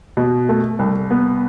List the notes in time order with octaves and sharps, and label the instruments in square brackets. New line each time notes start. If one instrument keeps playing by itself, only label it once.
[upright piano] B2
A3
C2
B3